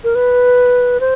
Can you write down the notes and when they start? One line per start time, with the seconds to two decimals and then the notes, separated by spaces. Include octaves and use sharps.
0.04 A#4
0.15 B4
1.00 C5